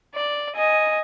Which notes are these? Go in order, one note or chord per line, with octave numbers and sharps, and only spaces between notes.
D5
D#5 G#5